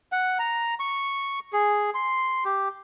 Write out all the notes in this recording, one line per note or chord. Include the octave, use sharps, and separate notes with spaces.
F#5
A#5
C#6
G#4
C6
G4